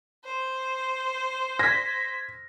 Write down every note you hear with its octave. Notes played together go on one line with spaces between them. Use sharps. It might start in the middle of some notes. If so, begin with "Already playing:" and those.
C5
G#6 A#6 B6